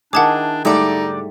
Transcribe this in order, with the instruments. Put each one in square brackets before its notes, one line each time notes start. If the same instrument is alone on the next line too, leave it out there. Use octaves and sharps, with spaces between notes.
[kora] D#3 E4 G#4 [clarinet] D4 [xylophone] F#5 A5 D6
[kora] G#2 G3 A3 [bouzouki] D3 D5 [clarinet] D#4